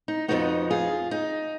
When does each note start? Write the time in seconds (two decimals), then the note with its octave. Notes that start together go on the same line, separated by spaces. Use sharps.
0.08 D#4
0.28 F2 F3 G#3 B3 D#4 F#4
0.71 F4 G#4
1.11 D#4